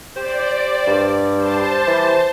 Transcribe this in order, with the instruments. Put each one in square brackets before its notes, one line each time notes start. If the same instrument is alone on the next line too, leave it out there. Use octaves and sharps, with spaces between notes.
[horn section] G4 C5 [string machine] D5
[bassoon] G2
[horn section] G3 G4 [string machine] C5 A5
[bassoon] E3